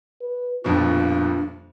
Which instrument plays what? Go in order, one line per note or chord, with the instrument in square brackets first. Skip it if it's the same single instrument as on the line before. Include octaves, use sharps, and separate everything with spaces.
[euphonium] B4
[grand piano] D#1 F2 B2 [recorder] D4 [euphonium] F4